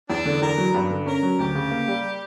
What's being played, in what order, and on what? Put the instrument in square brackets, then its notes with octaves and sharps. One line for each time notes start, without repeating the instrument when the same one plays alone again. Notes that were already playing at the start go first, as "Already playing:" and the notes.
[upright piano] E2 [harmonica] D4
[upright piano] D3
[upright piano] E2 [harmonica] A#4
[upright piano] F#3
G2
D3
[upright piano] C#4 [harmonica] A#4
[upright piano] F#3
[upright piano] D2 [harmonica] G4
[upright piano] C#3
A#3
G3